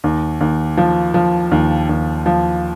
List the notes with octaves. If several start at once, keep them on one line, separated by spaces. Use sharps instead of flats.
D#2
D#2
F3
F3
D#2
D#2
F3